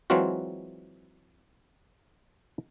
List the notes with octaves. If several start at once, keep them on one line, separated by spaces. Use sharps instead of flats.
E3 F#3 G#3 C4 F4 F#4